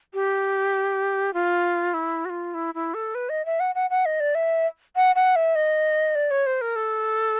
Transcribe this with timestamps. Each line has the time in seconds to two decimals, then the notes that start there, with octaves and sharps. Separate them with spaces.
0.14 G4
1.34 F4
1.94 E4
2.25 F#4
2.30 F4
2.54 E4
2.75 E4
2.94 A4
3.15 B4
3.29 D#5
3.46 E5
3.60 F#5
3.75 F#5
3.90 F#5
4.06 D#5
4.20 D5
4.35 E5
4.96 F#5
5.15 F#5
5.36 E5
5.55 D#5
6.15 D5
6.31 C#5
6.46 C5
6.61 A#4
6.76 A4